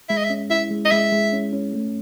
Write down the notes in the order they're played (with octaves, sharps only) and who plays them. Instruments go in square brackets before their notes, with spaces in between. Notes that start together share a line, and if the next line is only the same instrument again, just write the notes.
[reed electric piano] G#3 [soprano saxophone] E5
[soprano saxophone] D#5
E5
[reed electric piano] C#4
[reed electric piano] E4 [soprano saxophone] E5
[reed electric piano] G#3
[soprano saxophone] D#5
[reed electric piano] G#3 [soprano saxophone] E5
[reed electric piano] G#3
C#4
C#4
A3